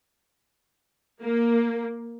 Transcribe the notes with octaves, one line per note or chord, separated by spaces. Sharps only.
A#3